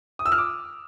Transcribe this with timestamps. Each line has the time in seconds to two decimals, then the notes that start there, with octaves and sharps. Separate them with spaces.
0.19 D#6
0.26 E6
0.32 F6
0.38 D6